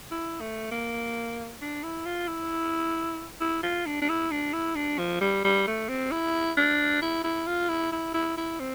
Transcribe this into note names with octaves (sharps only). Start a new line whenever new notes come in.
E4
A3
A#3
D4
E4
F4
E4
E4
F4
D4
D4
E4
D4
E4
D4
F3
G3
G3
A3
C4
E4
D4
E4
E4
F4
E4
E4
E4
E4
C4